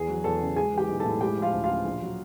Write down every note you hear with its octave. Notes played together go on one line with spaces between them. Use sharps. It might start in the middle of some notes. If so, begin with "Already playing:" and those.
Already playing: E2 G#4 G#5
F#3
E2 A4 A5
C#3
G#3 G#4 G#5
E3 G4 G5
B1
A4 A5
A2
G#3 G4 G5
F3
F4 F5
D2
F4 F5
C#3
A#1
F#3